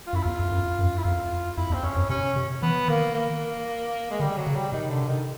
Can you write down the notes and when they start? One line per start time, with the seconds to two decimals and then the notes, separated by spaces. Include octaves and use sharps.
0.07 F4
0.13 F#2 E4
0.23 E2 F4
0.39 F2
0.51 F#2
0.79 F#2
0.97 E4
1.04 F2 F4
1.57 F2 E4
1.70 E2
1.73 C4
1.83 F2 C#4
1.96 F#2
2.09 C3 C#4
2.36 C3
2.62 E3 B3
2.88 D#3 A#3
3.14 A#3
4.10 G#3
4.20 D3 G3
4.37 F#3
4.47 C#3
4.55 G3
4.72 C3 D#3
4.90 D3
5.07 D#3